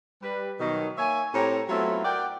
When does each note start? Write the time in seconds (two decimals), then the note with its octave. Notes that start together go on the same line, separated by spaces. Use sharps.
0.22 G3 B4
0.59 B2 D#3 F#3
0.98 A#3 C#5 E5 G#5
1.33 A2 C4 G4 C#5 A#5
1.69 F#3 A3 B3 C4 E4 F4
2.05 A#4 D5 F#5 G5